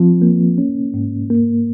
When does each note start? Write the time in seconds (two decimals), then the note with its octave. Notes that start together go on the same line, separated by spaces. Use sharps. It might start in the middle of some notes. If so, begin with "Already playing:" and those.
Already playing: F3 C4
0.22 A#3
0.58 C#4
0.94 G#2
1.30 A#3